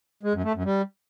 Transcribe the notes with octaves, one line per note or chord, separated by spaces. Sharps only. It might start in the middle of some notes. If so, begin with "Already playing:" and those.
G#3
F#2
A3
F#2
G3